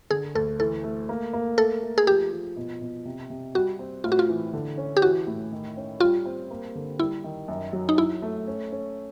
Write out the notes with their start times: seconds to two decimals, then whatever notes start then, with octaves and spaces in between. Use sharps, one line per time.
0.11 D3 G#4
0.35 D2 A4
0.60 E3 A4
0.84 A3
1.09 A#3
1.33 A#3
1.57 A3 A4
1.83 A3
1.98 G#4
2.07 F3 G4
2.32 F3
2.57 B2
2.81 B2
3.05 C3
3.30 C3
3.55 G3 F#4
3.79 C4
4.04 A2 F4
4.12 F#4
4.19 F4
4.29 E3
4.53 D3
4.78 C#4
4.97 G4
5.02 E3 F#4
5.27 A2
5.52 D#3
5.77 C#4
6.00 G3 F4
6.26 C4
6.51 A#3
6.75 D3
6.99 G3 E4
7.24 D#3
7.48 F#2
7.73 F#3
7.89 D#4
7.98 F#3 E4
8.22 A3
8.48 C#4
8.72 C#4